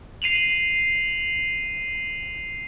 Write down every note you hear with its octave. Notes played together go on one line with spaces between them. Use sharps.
C7 D#7 F7 F#7